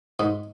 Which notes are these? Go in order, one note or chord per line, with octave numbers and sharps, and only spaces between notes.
G#2